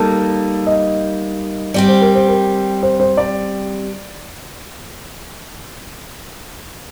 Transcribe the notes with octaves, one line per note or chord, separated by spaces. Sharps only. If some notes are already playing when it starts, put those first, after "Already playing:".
Already playing: G3 A#3 D#4 A4
D#5
G3 C4 G4 D5
C5
A#4
C5
A#4
C5
C5
D5